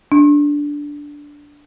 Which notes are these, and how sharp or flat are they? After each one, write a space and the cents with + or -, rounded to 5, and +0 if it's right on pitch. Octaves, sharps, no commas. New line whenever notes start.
D4 -10